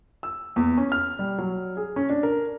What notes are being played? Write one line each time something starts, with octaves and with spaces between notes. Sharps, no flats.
E6
E2
C#4
F6
G3
F#3
G#4
C#4
D4
A#4